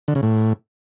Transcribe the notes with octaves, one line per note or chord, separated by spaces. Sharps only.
D3
C#3
A2